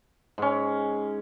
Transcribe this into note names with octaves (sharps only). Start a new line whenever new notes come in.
G#2 C#4